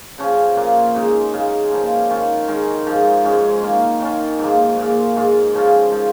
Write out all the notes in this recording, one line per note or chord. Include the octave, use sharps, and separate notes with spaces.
C#3 F3 C#4
A#2 A#3 F4
C#3 G#3 D#4
C#3 G#3 F4
C#3 F3 A#3
D#3 C#4 F4
D#3 G#3 C#4
G#2 F3 G#3
G#2 G#3 C#4
D#3 A#3 F4
D#3 C#4 F4
G#2 F3 A#3
A#2 G#3 F4
G#2 G#3 F4
C#3 F3 C#4 F4
F3 G#3